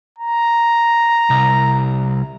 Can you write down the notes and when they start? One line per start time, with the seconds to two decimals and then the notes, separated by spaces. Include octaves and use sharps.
0.19 A#5
1.30 C2